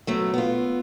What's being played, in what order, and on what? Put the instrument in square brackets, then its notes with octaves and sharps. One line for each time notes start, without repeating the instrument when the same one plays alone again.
[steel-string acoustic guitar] F#3 A3 B3
B3 F4